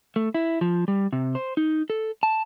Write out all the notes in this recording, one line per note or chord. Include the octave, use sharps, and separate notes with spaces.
A3
E4
F3
G3
C3
C5
D#4
A4
A5